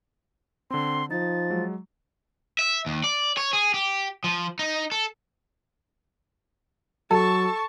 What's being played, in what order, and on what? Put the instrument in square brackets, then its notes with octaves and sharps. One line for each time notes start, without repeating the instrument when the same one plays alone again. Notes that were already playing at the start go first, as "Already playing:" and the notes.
[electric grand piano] D3 C4 [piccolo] C6
[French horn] F3 [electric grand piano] D#4 [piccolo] A6
[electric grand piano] F#3 G#3
[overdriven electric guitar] E5
D#2
D5
C#5
G#4
G4
F3
D#4
A4
[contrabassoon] F#3 [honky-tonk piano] A4 [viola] A5 C#6